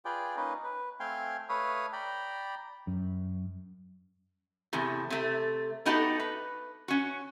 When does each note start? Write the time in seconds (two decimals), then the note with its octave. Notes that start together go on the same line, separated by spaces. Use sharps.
0.05 F4 G#4 B4 D5 G5
0.36 A#3 C#4 D#4 B4 D#5
0.63 B4
1.00 A3 C4 F5 G5 G#5 C6
1.49 A3 B4 C#5 F5 B5 D#6
1.93 D5 G5 A#5 B5
2.87 F#2
4.73 E2 A2 C3
5.10 C3 A3
5.86 A3 B3 D#4 F#4 G4 A4
6.20 B4
6.88 C#4 F#4